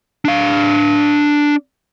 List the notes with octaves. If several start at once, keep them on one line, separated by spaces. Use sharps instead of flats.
D4 F5